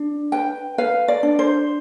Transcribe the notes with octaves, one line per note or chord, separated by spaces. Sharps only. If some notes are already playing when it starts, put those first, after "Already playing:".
Already playing: D4
B4 G5
B4 F5
D5
D4
C5